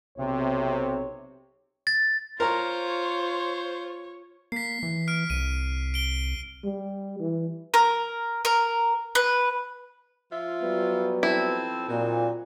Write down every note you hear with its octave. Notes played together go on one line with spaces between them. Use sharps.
B1 C3 C#5
A6
F4 A#4 C5 C#5 A#5
A#3 B6 C7
E3
F6 D7
C2 D#7
D7 G7
G3
E3
A#4
A#4
B4
F3 F4 E5
F#3 G3 B3
F3 C4 E4 A4
A#2 F#3 C4 D#4